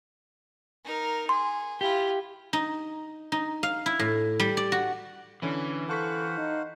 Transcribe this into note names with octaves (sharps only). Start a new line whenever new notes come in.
D#4 A#4
G#4 C6
E4 F4 G4
D#4
D#4
F5
E4
A2
G3
D5
F#4
D3 E3 C#4 E4
A4 C5 F5 F#5 A5 C#6 B6
D#4